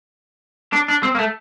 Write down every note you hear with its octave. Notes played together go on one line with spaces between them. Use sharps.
D4
D4
C4
A#3
A3